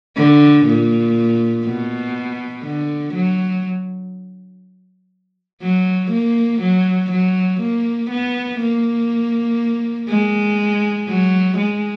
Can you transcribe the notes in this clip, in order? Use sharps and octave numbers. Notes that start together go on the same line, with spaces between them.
D3
A#2
B2
D3
F#3
F#3
A#3
F#3
F#3
A#3
B3
A#3
G#3
F#3
G#3